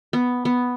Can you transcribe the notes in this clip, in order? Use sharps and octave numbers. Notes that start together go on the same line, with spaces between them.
B3
B3